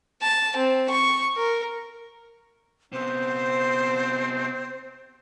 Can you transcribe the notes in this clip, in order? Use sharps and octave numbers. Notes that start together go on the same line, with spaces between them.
A5
C4
C#6
A#4
C3 B3 C4 C5